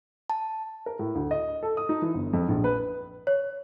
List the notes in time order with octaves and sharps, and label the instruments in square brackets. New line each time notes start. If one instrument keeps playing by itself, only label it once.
[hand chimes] A5
[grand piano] A#4
A2
D2
D#5
A4
D#6
D#4
E3
G1
F2
A#1
B4
[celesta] C#5